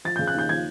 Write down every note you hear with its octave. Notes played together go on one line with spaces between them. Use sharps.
F3 A6
C#3 G6
F#6
D#2 G6
F3 G#6